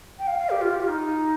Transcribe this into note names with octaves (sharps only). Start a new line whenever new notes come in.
G5
F5
F5
G4
F4
G4
F4
D#4